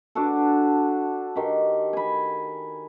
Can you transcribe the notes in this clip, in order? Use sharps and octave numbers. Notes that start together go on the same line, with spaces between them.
D4 F#4 A4
D#3 G4
G#5 B5